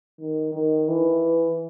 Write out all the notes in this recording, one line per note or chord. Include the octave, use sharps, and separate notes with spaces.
D#3
D#3
E3